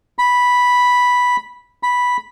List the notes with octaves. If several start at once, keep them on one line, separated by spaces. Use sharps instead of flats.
B5
B5